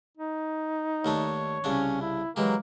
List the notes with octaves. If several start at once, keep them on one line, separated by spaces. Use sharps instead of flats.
D#4
D#2 A3 D4 C#5
C2 C#3 C#4 D4
E4
E3 F#3 G#3 A#3 G4